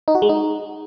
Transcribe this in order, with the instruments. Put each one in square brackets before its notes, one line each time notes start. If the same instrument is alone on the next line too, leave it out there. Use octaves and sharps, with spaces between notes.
[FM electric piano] D#4
F#4
G#3
D#4